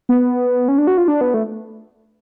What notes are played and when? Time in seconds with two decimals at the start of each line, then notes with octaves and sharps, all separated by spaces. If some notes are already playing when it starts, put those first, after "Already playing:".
0.09 B3
0.68 C#4
0.78 D4
0.87 F#4
0.98 F4
1.08 D4
1.21 B3
1.34 A3